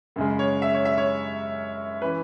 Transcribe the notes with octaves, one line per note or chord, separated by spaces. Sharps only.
F#2 C#3 G#3
C#5
E5
C#5
E5
C#5
E3 C#4 B4